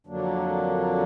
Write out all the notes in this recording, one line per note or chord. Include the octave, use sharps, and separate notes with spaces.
F2 D3 F#3 A#3 D4